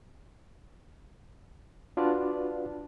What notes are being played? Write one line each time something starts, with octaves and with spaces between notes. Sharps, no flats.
D4 F4 F#4 B4 D5 A5